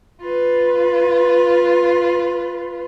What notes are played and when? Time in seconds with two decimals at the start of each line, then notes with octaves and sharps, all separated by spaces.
0.21 F4 B4